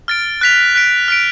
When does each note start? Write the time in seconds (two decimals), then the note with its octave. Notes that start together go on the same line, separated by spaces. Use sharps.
0.08 F6 A6 D7
0.41 F#6 B6 F7
0.75 F#6 B6 D7
1.08 F6 B6 D7